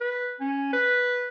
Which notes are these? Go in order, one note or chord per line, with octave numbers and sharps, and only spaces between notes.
B4
C#4
B4